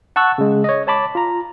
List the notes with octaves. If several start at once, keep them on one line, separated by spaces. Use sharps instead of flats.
F#5 A5 C#6 E6 F#6
C#3 G#3
C#5 D#5
C#5 A5 B5 D6
F4 A#5